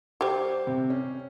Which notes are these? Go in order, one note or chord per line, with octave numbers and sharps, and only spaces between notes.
G3 G4 C5
C3
C#4